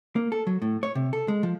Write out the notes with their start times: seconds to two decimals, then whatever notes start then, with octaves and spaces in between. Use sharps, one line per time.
0.16 A#3
0.32 A4
0.47 F#3
0.62 A2
0.83 C#5
0.95 C3
1.13 A4
1.28 G#3
1.43 F3